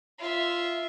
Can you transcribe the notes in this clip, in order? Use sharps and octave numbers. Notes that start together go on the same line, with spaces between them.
F4 E5